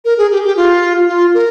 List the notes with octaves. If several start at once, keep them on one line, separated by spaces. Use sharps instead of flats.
A#4
G#4
G4
G4
F4
F4
A#4